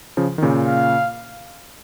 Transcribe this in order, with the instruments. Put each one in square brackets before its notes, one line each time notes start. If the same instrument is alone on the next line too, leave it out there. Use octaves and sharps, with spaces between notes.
[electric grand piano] C#3 F3
D#3
A#2 C#3
[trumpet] F5